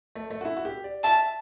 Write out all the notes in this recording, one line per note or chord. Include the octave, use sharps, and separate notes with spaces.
A3
A3
F#4
E4
F#4
G4
D5
E5 A5